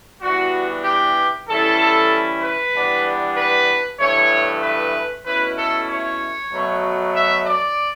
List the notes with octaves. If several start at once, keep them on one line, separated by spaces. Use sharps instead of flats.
E3 G3 B3 D4 F#4
G4
E3 G3 C#4 E4 A4
B4
E3 G3 B3 D4
B4
G2 E3 A3 C#5
B4
B2 A3 C#4 E4 B4
A4
C#5
B2 F#3 A3
E5
D5